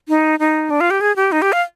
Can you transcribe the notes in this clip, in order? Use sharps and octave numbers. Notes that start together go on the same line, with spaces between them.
D#4
D#4
D4
F4
G4
G#4
G4
D#4
G4
F5